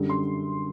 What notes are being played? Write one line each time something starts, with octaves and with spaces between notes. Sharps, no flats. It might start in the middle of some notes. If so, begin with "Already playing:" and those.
Already playing: F#2 D3 G3
C6